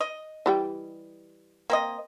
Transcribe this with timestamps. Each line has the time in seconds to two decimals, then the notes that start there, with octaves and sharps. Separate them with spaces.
0.01 D#5
0.46 E3 G3 G5
1.70 A#3 C4 D#5